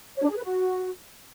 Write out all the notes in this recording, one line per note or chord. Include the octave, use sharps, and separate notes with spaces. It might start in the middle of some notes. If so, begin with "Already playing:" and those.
C#5
D4
G#4
B4
F#4